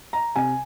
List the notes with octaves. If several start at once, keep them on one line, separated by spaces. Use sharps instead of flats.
A#5
C3 G#5